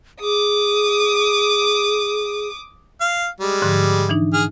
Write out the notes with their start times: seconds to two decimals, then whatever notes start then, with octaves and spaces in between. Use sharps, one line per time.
0.20 G#4 D6 D#6
3.01 F5
3.41 G3 G#3
3.62 G#2 D3 F3
4.09 E3 D4 D#4
4.34 G#4 F6